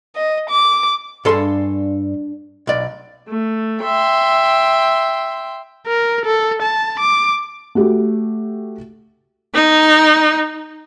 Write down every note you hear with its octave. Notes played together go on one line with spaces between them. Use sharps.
D#5
D6
G2 D4 G#4 A4 C6
B1 D5
A3
E5 G5 C6
A#4
A4
A5
D6
A3 F#4 G4
D#4